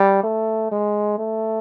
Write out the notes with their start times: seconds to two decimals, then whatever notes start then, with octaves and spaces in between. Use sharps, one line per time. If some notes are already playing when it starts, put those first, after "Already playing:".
Already playing: G3
0.24 A3
0.71 G#3
1.18 A3